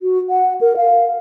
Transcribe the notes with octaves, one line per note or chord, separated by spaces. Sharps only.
F#4
F#5
A#4
F5